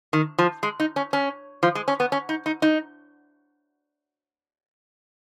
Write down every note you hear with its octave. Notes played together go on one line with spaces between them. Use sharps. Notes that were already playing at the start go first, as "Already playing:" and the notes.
D#3
F3
G#3
D#4
C#4
C#4
F3
G#3
C#4
B3
C#4
D#4
D#4
D#4